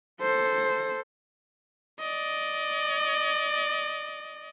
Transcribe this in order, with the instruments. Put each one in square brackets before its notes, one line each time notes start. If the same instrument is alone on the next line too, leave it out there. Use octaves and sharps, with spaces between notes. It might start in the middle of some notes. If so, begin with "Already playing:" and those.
[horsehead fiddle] A4 C5
[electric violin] D5 D#5